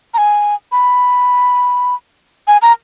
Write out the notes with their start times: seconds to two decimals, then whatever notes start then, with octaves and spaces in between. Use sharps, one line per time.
0.14 A#5
0.18 G#5
0.72 B5
2.47 G#5
2.62 A#5